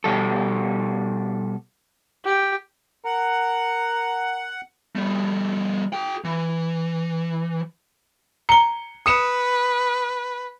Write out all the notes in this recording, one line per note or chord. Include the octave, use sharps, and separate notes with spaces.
B2 G3 A4
G4
A#4 F#5
G3 A3
G#4 G5
E3
A#5 C#7 G7
B4 D#6 C#7 E7